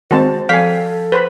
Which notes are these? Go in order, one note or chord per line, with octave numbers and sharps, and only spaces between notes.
D#3 G#3 C4 F#4 C5 A5
F3 A4 F5 G5 G#5 B6
B4 C5 B5